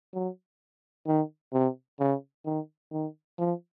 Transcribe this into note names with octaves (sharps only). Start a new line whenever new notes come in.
F#3
D#3
C3
C#3
D#3
D#3
F3